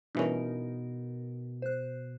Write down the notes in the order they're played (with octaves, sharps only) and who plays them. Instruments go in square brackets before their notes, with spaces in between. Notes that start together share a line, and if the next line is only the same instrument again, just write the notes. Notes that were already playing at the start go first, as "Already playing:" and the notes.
[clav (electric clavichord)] G2 E3 C#4 [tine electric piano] B2 [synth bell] D#4 A#4
[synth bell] C5 F#6